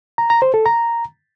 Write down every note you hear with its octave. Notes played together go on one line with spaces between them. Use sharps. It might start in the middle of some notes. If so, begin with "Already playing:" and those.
A#5
A#5
C5
A4
A#5